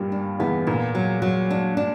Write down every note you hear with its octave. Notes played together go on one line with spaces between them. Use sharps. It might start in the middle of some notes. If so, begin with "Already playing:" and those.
Already playing: G2 A#2 G3 A#3
D4
E2 E3 B3
A#2 A#3
F#3
F#3
D4
D4